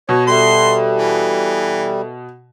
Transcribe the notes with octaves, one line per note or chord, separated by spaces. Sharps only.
B2 C#5
G3 A4 E5 C6
E3